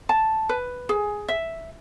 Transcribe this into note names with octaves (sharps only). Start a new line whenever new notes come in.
A5
B4
G#4
E5